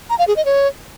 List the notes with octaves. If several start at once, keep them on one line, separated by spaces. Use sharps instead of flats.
A#5
F5
G#4
D#5
C#5